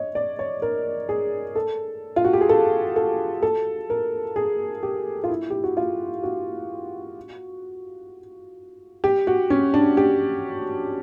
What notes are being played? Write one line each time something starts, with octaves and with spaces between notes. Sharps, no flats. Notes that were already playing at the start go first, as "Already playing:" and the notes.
Already playing: C#5 D#5
D5
C#5
A#4
G#4
A4
F4
F#4
G4
G#4
A4
A4
A4
A#4
G#4
G4
F4
E4
G4
F#4
F4
F#4
G4
F#4
C#4
D4
G4